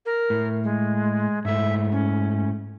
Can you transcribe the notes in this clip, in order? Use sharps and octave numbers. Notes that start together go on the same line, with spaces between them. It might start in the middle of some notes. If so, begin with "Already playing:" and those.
A#4
A2
G#3
G#2 A3 E5
C#4